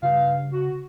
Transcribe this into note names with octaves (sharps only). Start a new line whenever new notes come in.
G2 C#3 F5
F#4